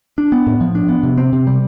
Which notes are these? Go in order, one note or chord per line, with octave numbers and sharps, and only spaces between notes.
D4
B3
A2
F3
D4
B3
C3
C4
C3
G3